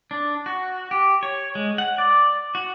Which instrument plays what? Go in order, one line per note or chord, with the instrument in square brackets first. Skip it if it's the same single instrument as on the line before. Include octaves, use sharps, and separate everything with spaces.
[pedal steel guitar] D4
F#4
G4
C#5
G#3
F#5
D5
F#4